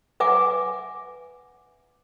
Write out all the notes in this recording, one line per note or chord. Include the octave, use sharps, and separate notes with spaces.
B4 E5 F#5 G#5 D6